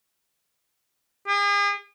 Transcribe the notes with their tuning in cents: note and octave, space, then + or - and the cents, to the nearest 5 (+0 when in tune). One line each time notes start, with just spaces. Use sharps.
G#4 -40